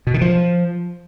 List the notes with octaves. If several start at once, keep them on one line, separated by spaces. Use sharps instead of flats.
B2
D#3
F3